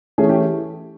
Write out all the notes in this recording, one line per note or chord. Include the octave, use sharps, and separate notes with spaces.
E3 A3 C#4 G#4
G4